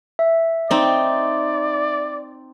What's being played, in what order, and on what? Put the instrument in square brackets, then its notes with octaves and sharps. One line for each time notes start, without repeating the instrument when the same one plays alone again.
[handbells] E5
[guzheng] C4 D#4 [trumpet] D5